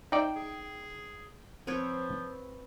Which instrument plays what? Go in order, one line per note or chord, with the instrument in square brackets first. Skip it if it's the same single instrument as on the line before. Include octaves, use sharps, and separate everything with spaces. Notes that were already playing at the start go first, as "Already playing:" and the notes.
[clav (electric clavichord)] D#4 D5 E5 [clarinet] C5 [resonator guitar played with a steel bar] G5
[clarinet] G#4
[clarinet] F3 [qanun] C4 B4 C#5